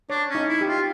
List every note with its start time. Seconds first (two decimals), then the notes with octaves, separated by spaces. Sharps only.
0.10 D4 C#5
0.29 C#4
0.35 D#4
0.48 E4
0.61 G4
0.67 F4